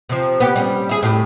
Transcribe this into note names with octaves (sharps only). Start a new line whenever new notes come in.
C3 F3
B3 G4
G3 C#4
E4 G#4
A2 G4